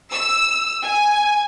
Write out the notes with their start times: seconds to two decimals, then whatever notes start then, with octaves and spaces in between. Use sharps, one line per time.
0.11 E6
0.83 G#5